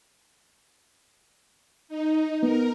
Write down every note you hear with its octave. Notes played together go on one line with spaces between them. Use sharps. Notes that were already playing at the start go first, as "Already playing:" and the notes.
D#4
B3 A#4